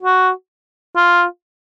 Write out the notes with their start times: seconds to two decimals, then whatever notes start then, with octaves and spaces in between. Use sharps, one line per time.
0.03 F#4
0.96 F4